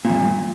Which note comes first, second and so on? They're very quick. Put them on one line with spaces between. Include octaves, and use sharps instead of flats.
A#2 E2 G2